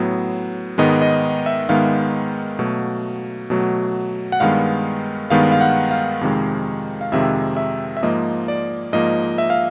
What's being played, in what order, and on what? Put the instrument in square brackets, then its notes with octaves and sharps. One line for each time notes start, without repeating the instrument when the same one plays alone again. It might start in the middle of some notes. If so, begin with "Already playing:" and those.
Already playing: [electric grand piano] A2 F#3 B3
G#2 D#3 G#3 B3 D#5
D#5
E5
G#2 D#3 G#3 B3 F5
B2 F#3 A3
B2 F#3 A3
F#5
G2 D#3 G#3 B3 F5
G2 D#3 G#3 B3 F5
F5
F#5
F5
F2 C3 D#3 G#3
F5
F2 C3 D#3 G#3 E5
E5
E5
G#2 F3 A#3 D#5
D5
G#2 F3 A#3 D#5
E5
F5